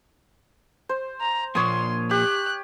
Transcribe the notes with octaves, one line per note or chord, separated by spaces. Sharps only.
C5
A#5
A#2 F3 A#3 C#5 C6 D#6
G4 F#6